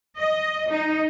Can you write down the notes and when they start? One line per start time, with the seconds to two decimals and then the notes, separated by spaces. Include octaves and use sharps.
0.17 D#5
0.69 D#4